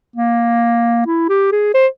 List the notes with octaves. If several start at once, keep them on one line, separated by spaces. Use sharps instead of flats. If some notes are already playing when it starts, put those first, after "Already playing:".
A#3
E4
G4
G#4
C5